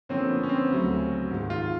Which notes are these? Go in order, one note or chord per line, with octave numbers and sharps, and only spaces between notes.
D3 F3 A#3 C4 C#4
B3
C#4
C4
D2 C#3 F#3 A3
G#2 D#3 G#3
F4